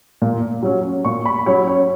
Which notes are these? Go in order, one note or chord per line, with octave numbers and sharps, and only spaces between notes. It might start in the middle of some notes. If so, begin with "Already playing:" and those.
A#2
F#3 C#4
A#2 C#6
B5
F#3 C#4 C#5
C#5